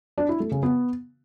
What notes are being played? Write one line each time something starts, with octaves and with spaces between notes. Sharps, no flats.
D4
E4
A3
C#3
B3